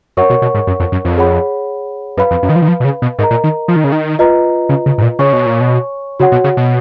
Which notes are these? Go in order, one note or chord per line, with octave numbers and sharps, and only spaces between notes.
F#2 A#4 C#5 F#5 C#6
B2
B2
G#2
F#2
F2
F#2
F2
G#4 C#5 F#5 B5
F#2 B4 F5 B5
F2
F#2
D#3
F3
D#3
F3
B2
C#3
B2
G#2 A#4 D#5 A#5
A#2
D#3
F3
D#3
C#3
D#3
F4 B4 D#5 A#5
C#3
C#3
G#2
A#2
C#3 C#5 G#5 C#6
B2
A#2
B2
C#3 F#4 C#5 F#5
B2
C#3
B2